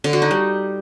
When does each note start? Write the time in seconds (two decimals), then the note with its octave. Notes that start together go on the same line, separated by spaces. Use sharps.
0.04 D3
0.13 F#4
0.22 D#4
0.31 G3